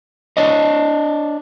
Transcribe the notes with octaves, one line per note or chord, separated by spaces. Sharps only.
D4 C#5 D#5